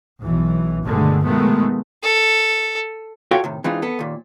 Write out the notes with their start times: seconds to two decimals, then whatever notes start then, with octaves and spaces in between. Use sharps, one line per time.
0.22 B1 E3
0.83 G1 B2 D3 D#3 G#3 A3
1.22 B2 D#3 F3 G#3 A3 B3
2.02 A4
3.31 F4 F#4 A4 C#5 F5 G5
3.44 A2 C3 D#3
3.64 E3 G#3 C4 D4 D#4 F4
3.82 B3 A4
3.99 D#2 A#2